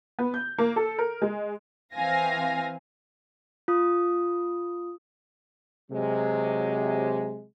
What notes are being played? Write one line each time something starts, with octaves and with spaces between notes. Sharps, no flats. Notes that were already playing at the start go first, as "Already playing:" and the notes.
B3
G6
A#3
A4
A#4
G#3
E3 C4 F5 G#5 A#6
F4 D#6
C3 F#3 G#3